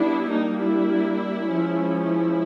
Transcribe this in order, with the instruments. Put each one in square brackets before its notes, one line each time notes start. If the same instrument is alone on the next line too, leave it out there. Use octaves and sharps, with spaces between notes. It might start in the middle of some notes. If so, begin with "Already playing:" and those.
Already playing: [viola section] G3 B3 D4 E4
G3 A#3 D4 D#4
E4
F3 G#3 C#4
E4